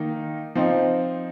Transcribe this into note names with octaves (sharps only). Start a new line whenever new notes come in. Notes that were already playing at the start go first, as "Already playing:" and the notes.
Already playing: D#3 A#3 D#4
F3 C4 D#4